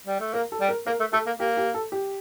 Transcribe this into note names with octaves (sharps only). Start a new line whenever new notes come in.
G3
A3
A#3 A#4
A4
G3
A#4
A#3 A#4
A3
A3 A4
A#3
A#3 G4
G4
A4
G4